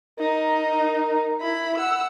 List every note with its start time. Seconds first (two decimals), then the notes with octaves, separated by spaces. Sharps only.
0.19 D#4 A#4
1.41 E4 B5
1.77 F#5 E6